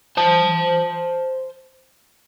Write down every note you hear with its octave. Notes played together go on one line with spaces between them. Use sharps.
C5 A5